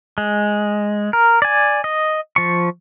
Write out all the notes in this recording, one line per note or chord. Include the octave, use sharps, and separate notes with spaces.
G#3
A#4
D5 G#5
D#5
F3 C#6